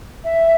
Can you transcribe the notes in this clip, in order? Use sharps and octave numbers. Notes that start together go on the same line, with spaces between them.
E5